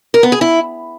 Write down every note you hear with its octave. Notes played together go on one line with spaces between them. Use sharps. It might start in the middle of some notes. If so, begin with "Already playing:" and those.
A#4
B3
G#4
E4